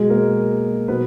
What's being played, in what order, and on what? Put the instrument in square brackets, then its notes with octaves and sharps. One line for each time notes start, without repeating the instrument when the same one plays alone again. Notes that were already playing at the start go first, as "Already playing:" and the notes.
Already playing: [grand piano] B2 F#3 G#3 G#4
A#3 A#4
B2 F#3 B3 B4